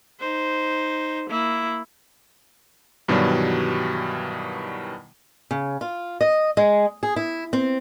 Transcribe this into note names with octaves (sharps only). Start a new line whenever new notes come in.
D#4 C5
A#3 E4
G2 B2 D#3 E3 F#3 G3
C#3
F4
D#5
G#3
G#4
E4
C4